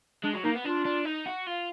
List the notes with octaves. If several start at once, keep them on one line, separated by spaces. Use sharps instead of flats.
G#3 D4
F#3
A#3 D#4
B3
D4 F4
D4
D#4
F#4
F4